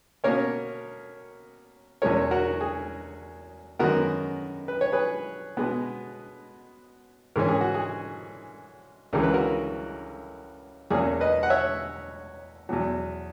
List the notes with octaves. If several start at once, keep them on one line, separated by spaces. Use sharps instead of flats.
B2 A#3 C#4 A#4 C#5
E2 B2 G#3 C#4 A#4 C#5
F#4 A#4
G#4
F#2 D#3 G#3 B3 F#4 A#4
B4
C#5
G#4 B4
B2 G#3 B3
G#2 E3 G#3 C#4 A#4
G#4
F#4
G#4
C#2 C#3 E3 G#3 A#4
B4
F#4 A#4
E2 B2 A#3 C#4 G#4
B4 D#5
F#5
C#5 E5
E2 B2 F#3